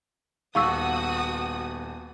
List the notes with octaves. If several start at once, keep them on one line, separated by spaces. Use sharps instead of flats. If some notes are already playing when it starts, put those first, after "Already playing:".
D#1 B3 F#4 F5 C#6 D#6 E6